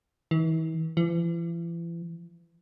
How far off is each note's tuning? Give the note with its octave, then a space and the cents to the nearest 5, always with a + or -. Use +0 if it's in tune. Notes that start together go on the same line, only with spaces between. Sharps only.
E3 -45
E3 +40